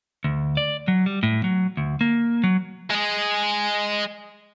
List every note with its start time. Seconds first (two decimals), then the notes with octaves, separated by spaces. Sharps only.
0.24 D2
0.57 D5
0.88 F#3
1.06 G3
1.23 A2
1.44 F#3
1.77 D2
2.01 A#3
2.44 F#3
2.90 G#3 G#4